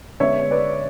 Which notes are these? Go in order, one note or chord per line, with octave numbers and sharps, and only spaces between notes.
D3 G#3 B3 D4 C#5 E5
B4 D5